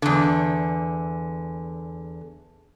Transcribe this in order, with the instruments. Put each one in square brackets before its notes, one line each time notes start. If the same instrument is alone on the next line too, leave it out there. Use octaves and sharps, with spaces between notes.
[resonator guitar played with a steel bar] E2 D3